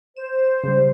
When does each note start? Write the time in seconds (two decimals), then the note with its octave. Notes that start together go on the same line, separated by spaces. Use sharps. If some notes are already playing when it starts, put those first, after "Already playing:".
0.17 C5 E7
0.64 C#3 G3